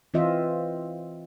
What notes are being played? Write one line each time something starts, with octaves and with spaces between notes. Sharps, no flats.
E3 C4 F4 D#5 E5